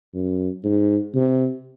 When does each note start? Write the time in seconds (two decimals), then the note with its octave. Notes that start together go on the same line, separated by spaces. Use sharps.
0.14 F#2
0.64 G#2
1.14 C3